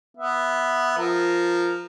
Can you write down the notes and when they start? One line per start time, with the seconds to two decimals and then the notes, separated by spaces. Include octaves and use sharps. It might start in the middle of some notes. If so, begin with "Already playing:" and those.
0.17 B3 E5
0.98 F3 A#4